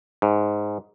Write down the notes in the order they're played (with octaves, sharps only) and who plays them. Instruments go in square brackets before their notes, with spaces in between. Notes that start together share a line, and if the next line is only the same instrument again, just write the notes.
[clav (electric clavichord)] G#2